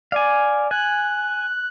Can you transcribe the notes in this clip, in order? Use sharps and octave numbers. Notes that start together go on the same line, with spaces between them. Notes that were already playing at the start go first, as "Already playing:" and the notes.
D5 F5 G#5
G#5 F#6